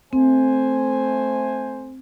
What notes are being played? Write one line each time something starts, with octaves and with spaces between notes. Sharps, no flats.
A3 C4 C5 G#5